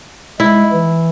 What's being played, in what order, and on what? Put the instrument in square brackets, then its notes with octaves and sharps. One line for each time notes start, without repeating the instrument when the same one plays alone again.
[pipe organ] G#3 [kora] E4
[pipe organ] E3